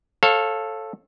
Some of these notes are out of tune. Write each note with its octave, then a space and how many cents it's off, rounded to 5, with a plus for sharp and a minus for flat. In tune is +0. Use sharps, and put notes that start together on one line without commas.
A4 +0 C#5 -35 F5 +5